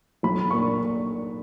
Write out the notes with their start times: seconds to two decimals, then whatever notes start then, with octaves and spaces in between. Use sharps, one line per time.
0.23 B1 B5
0.50 A#2 A#3 D4 C#6